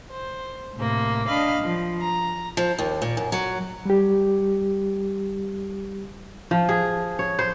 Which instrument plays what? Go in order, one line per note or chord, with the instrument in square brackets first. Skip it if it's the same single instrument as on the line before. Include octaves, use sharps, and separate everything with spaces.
[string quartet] C5
A2 C3 A#3
D4 D#5 F5 B5
F3
A#5
[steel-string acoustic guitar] F3
D#2
A#2
F#2
F#3
[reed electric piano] G3 G4
[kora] F3
G#4
C#5
C5